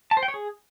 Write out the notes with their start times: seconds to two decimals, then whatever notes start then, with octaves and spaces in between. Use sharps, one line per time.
0.11 A5
0.17 C5
0.23 G5
0.28 C#5
0.34 G#4